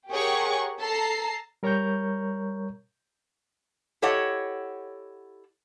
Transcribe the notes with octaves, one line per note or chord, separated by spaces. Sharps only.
G4 G#4 A#4 C#5 F#5 C#6
A4 A5 A#5 C7
G3 A#4 C#5 A#5 C#6 G6
E4 G4 A4 C#5 D#5 F#5